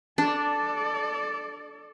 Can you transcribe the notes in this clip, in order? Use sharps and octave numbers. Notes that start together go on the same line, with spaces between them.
D4 A4 D5